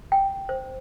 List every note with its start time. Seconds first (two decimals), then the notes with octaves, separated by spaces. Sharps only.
0.12 G5
0.49 C5